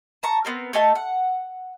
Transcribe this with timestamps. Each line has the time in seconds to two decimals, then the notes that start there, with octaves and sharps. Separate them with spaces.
0.23 A5 A#5 C#6
0.45 B3 C4 A#4
0.73 A3 D#4 G#5 A5
0.95 F#5